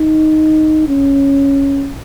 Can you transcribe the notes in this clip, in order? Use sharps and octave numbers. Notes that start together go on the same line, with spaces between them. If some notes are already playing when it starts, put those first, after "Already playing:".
Already playing: D#4
C#4